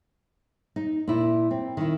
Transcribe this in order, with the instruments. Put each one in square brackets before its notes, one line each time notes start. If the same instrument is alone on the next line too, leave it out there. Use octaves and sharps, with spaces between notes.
[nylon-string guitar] D#4
A#2 E4
C4
D#3 E4